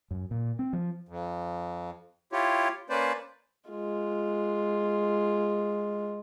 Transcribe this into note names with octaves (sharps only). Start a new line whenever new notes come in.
F#2
A#2
C4
F3
F2
E4 F4 G4 C#5
A#3 C#4 B4 C5 D5
G#3 F4